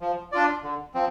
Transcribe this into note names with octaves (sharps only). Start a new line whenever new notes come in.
F3
D4 F4 D5
D3
F3 C4